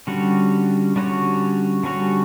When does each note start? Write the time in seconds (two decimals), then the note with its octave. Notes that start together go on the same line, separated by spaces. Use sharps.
0.07 D3 G3 C#4 F#4 C#5
0.96 D3 G3 C#4 F#4 C#5
1.84 D3 G3 C#4 F#4 C#5